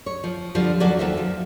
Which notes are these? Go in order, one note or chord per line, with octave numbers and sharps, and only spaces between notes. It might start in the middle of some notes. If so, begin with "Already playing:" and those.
C#5
F3
D3 F3 G3
D#2 F#3 C#4 A4 D5 G#5
D#2 F#3 A4 C5 E5
F3